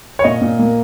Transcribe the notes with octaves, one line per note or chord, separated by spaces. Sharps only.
C#5
A#2 D#5
A#2
A#3